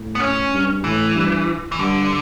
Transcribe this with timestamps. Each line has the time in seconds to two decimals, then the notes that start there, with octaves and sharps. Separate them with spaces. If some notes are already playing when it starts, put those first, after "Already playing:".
Already playing: A2
0.15 B3
0.20 C#4
0.51 G2
0.83 A2 E3
1.15 G2
1.72 E3
1.79 G2 D3